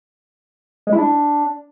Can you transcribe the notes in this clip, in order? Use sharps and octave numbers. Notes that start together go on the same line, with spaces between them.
G#3
E4
D4